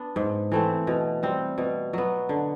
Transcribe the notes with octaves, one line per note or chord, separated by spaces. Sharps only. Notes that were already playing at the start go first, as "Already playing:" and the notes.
Already playing: B3 D4
G#2
E3 A3 C4
B2
G3 C4
B2
F#3 B3
D3